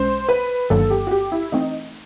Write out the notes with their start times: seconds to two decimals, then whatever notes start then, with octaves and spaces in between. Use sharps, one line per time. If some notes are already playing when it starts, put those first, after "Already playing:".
Already playing: B1 B2 G#3 C#4 C5
0.29 B4
0.70 G1 G2 D#3 F#3 A#3 A4
0.90 G4
1.07 F#4
1.11 G4
1.32 E4
1.52 E3 A3 C4 D#4